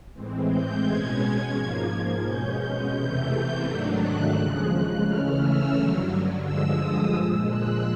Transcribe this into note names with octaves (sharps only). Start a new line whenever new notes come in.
A2 E3 G#3 C4
G6
B2 G#3 C#4 G#6
G#2 F3 A#3 G#6
B2 G#3 C#4 G6
E2 C3 E3 A3 G6
G#2 D#3 F#3 A3 D4
F#6
D#2 C#3 F3 G#3 F#6
C#3 E3 A3 C#4 F6
E6
G2 D3 F#3
G2 D3 F3 G#3 E6
D#6
A#2 F3 G#3 E6
F#6